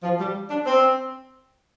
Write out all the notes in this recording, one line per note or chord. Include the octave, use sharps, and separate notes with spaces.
F3
G3
D4
C4